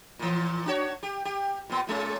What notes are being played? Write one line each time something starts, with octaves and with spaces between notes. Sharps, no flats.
A#2 E3
D4 F#4 C#5
G4
G4
A#2 B3
A#2 G#3 C#4